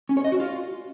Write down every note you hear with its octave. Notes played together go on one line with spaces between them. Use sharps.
C#4
C#5
D#5
F#4
F4